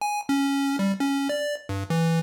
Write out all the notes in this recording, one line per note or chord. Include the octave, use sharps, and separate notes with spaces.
G#5
C#4
G3
C#4
D5
G2
E3